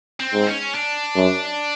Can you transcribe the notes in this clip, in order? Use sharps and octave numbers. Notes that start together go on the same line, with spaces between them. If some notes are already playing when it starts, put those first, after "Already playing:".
C4
G#2
C#4
D4
F#2